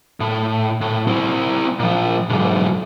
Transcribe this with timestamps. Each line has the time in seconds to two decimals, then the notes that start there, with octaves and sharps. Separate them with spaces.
0.20 A2
0.81 A2
1.07 C4 E4
1.79 A#2 F3
2.29 B1 G#2